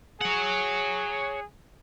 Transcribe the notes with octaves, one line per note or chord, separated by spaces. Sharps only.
G#4 C#5 F#5